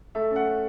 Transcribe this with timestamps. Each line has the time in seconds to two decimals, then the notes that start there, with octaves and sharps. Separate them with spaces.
0.15 A3 E5
0.31 C#4
0.36 F#5